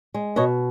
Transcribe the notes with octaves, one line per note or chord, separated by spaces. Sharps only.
G#3
B2 C#5 D#5